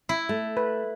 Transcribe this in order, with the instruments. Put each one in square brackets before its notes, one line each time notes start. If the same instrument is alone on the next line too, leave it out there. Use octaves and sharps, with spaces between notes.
[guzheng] E4
[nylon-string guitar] A3
[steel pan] B4